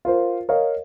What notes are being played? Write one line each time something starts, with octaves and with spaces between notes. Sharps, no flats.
F4 A#4 C5
A#4 C#5 D#5 F5